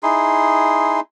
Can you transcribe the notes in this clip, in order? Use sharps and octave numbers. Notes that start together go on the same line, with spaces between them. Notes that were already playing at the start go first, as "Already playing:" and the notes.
D#4 E4 G#4 C6